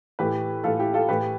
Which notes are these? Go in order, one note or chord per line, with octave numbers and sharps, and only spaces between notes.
A2 E3 G4 B4
A2 E3 F4 A4
E4 G4
F4 A4
A2 E3 G4 B4